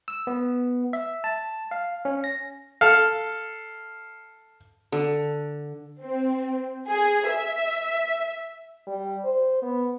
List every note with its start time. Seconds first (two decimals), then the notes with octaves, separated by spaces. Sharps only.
0.08 E6
0.27 B3
0.93 E5
1.24 A5
1.71 F5
2.05 C#4
2.24 A#6
2.81 A4 F5
4.92 D3
6.03 C4
6.89 G#4
7.30 E5
8.87 G3
9.24 C5
9.62 B3